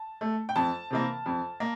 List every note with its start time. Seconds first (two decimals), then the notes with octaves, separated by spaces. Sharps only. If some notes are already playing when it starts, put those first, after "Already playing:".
Already playing: A5
0.21 A3
0.49 G5
0.56 F2 A5
0.91 C3 E3 A#3
1.26 F2
1.60 A#3